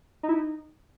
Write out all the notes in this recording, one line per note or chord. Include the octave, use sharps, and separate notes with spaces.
D#4
E4
D#4